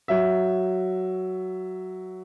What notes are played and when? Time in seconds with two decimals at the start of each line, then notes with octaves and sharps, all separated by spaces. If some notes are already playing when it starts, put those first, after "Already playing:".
0.08 F#3 E5